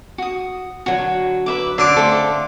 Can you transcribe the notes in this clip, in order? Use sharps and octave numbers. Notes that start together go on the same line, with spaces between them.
F#4 D#6
D3 F#3 F#4
B4 E5 D6
D3 C#4 A5 C6 D6
C#3 A3 C4 A4